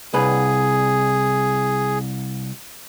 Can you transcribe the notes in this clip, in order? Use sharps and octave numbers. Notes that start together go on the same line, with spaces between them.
C2 G#4 B4